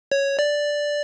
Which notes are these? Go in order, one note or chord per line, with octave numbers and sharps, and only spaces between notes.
C#5
D5